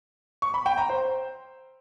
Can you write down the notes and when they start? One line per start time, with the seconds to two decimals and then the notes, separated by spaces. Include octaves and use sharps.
0.42 C#6
0.54 B5
0.66 G5
0.78 A#5
0.89 C5